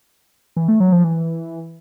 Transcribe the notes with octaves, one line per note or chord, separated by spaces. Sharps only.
E3
A3
F#3
F3
E3